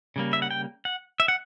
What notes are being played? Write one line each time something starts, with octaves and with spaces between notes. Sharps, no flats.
C#3 G3 A#3
E5
F#5
G5
F#5
E5
F#5